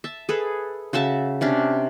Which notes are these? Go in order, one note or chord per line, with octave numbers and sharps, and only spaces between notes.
E5 A5
G#4 A4 B4
C#3 F#4 E5 A5
C3 C#4 D4